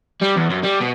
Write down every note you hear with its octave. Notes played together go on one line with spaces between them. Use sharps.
G3
E2
F#2
G3
B2